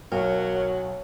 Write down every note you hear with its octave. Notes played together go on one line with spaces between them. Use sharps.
B1 F#3 A#4 C#5